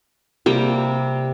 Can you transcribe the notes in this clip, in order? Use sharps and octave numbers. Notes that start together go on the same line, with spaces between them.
C3 G3 A#3 G5